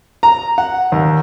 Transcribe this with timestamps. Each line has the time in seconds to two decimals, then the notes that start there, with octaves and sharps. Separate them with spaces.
0.23 A#5
0.58 F#5
0.92 D#2